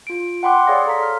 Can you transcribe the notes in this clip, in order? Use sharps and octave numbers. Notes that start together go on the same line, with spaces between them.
F4 D7
F#5 G5 B5 C6 D6 F#6
G#4 C#5 D5 F5 A#6
A4 F5 A#5 C6 B6
F6